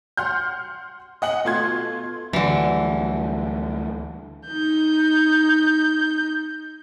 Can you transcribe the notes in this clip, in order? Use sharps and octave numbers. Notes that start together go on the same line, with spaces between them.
F#5 C6 F6 G6
D#5 F#5 F#7
B2 A3 F4 C6 G#6
D2 D3 E3 F#3 G3
D#4 G6